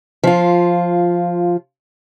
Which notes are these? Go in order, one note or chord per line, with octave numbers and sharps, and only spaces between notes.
F3 F4